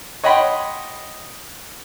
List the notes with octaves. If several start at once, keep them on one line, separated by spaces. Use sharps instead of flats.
C#5 D#5 F#5 G5 B5 C6